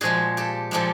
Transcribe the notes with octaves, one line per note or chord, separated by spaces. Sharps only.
A#2 F3 G#3 F#4 G#4
G4 A4
A#2 F3 G#3 G4 A4